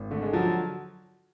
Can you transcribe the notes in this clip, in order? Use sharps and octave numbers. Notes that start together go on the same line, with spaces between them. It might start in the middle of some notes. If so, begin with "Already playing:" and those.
Already playing: G#1
D3 A3
G#3
F3 F#3